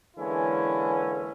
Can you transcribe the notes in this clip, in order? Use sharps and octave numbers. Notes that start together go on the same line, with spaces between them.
D3 E3 G#3 A#3 C#4 E4